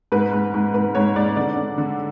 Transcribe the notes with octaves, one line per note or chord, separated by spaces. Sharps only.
G#2 B4
G#2
G#2
G#2 B4
G#2 C#5
G#2 D5
D3 D5
D3
D3